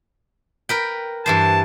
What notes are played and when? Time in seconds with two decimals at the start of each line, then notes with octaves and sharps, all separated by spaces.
0.69 A#4 B4 G5
1.26 G2 E3 C5 A5